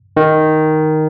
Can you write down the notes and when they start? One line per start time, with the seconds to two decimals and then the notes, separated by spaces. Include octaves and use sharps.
0.17 D#3